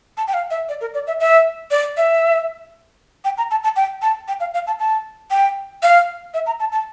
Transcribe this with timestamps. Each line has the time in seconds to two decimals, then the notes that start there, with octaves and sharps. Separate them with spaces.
0.17 A5
0.28 G5
0.34 F5
0.51 E5
0.69 D5
0.81 A#4
0.94 D5
1.07 E5
1.20 E5
1.71 D5
1.97 E5
3.25 G5
3.38 A#5
3.51 A5
3.63 A5
3.76 G5
4.02 A5
4.28 G5
4.40 F5
4.54 F5
4.67 A5
4.79 A5
5.31 G5
5.83 F5
6.34 E5
6.46 A#5
6.60 A5
6.72 A5